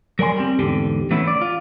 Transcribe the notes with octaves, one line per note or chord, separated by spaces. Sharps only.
F#3 A#4 D5 G#5 C6
G3 C4
E2 G#2 D3 G4
E3 A3 B3 C#4 E4
D5
F4